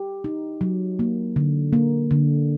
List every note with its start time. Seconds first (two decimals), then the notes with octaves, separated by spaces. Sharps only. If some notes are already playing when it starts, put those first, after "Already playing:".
Already playing: G4
0.24 D#4
0.61 F#3
0.99 A#3
1.36 D3
1.73 A#3
2.11 D3